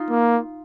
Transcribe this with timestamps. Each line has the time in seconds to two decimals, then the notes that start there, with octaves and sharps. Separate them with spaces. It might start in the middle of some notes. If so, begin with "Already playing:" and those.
Already playing: D#4 F4
0.10 A#3